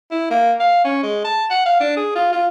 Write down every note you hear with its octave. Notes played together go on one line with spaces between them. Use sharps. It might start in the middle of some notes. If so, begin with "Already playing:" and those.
E4
A#3
F5
C#4
G#3
A5
F#5
F5
D4
G#4
F4
F4